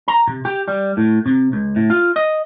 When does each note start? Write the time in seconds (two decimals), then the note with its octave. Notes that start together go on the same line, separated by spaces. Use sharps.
0.08 A#5
0.27 C3
0.45 G4
0.68 G3
0.97 A2
1.26 C3
1.53 C#2
1.76 A2
1.90 F4
2.16 D#5